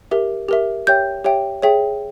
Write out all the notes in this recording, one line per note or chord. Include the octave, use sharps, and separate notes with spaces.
G4 A#4 E5
G4 A#4 E5
G4 C#5 E5 G5 G6
G4 C#5 E5 G5
G#4 C#5 E5 G5